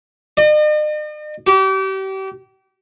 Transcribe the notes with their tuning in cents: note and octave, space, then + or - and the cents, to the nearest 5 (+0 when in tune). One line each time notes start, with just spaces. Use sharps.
D#5 -45
G4 -35